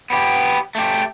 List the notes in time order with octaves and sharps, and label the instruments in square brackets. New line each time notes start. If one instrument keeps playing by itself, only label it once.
[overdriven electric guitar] B3 G4
A3 G4